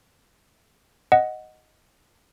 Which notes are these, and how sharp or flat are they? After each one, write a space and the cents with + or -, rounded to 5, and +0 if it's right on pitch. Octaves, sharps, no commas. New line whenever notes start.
D#5 +0 F#5 +0